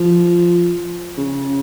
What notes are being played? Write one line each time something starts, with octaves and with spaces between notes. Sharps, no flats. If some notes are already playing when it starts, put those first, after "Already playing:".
Already playing: F3
C#3